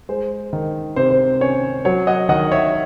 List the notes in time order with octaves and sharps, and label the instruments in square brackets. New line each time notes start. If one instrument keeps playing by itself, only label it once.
[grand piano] G#3 C5
D#3
C3 C5
C5
C#4 C#5
F#3 C#5
D#5 F#5
D#3 D#5 F#5
C#5 E5